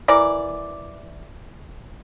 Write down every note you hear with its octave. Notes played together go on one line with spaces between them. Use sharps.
E3 A#4 D5